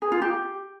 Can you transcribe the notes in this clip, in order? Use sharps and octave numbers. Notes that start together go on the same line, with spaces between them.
G#4
F4
G4